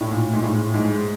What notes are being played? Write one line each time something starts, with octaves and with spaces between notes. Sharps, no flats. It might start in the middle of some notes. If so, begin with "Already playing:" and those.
A2
A#2
G#2
A2
G#2